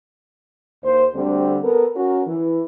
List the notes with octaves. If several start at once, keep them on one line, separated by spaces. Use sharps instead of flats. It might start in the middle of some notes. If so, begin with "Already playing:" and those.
D#2 C5
D2 D3 G3 C4
B3 A4 A#4
C#4 F#4 A#4
E3